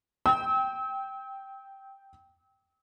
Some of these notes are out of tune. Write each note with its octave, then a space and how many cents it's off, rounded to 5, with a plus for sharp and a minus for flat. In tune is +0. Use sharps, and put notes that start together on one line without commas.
G5 +0 E6 -40